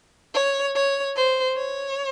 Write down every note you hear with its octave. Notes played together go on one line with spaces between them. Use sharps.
C#5
C#5
C5
C#5